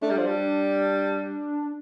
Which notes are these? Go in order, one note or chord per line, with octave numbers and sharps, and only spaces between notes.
A3 D4
G3
F3
G3